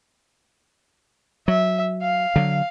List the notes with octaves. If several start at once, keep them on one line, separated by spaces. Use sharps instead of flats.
F#3 E5
F5
D3 F#3